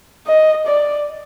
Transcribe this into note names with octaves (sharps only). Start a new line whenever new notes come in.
D#5
D5